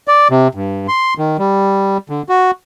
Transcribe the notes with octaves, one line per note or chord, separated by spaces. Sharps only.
D5
C3
G2
C6
D#3
G3
D3
F#4